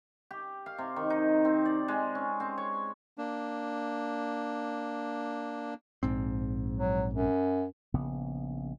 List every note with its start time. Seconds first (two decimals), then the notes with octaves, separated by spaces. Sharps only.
0.31 G4
0.66 F5
0.78 C3
0.96 D#3
1.10 D#4
1.45 C4
1.65 D5
1.88 G#3
2.15 C#4
2.40 C4
2.58 C#5
3.18 A#3 D4
6.03 A#1 G#2 C4
6.77 F#3
7.13 F#2
7.94 A#1 C#3 B3